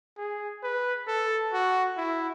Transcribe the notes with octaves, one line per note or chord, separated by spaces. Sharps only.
G#4
B4
A4
F#4
E4